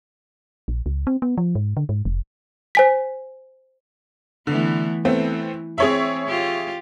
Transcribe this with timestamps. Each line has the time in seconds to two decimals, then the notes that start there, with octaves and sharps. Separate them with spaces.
0.68 A#1
0.86 C#2
1.07 C4
1.22 B3
1.38 F3
1.55 G#2
1.77 D3
1.89 G#2
2.05 F1
2.75 C5 G#5 B6
4.47 D3 E3 A3 B3
5.05 E3 A3 B3 C4
5.78 C4 G#4 C#5 E5
6.28 F4 G4